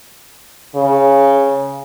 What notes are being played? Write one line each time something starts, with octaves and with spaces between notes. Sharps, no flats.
C#3